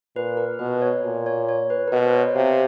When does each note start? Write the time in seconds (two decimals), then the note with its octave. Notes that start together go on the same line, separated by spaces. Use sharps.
0.16 A#2 B4
0.37 A#4
0.59 B2 B4
0.82 C#5
1.04 A#2
1.26 C#5
1.49 C#5
1.70 B4
1.87 A#4
1.92 B2 B4
2.06 C5
2.14 C#5
2.36 C3 F5